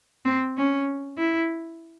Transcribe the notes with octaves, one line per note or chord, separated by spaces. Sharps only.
C4
C#4
E4